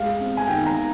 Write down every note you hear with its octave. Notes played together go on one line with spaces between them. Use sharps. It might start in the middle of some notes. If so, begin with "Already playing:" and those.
Already playing: G#3 F5
C4
G#5
D#3 G5
A#5
D#3